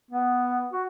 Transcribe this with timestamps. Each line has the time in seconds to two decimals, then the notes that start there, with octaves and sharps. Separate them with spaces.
0.11 B3
0.73 F#4